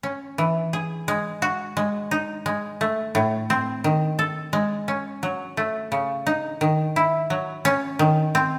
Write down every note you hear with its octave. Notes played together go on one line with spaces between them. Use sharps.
C#4
E3
G#4
G#3
F#4
G#3
D#4
G#3
A3
A2
C4
D#3
A4
G#3
C#4
F#3
A3
C#3
D#4
D#3
E4
F#3
C#4
D#3
C4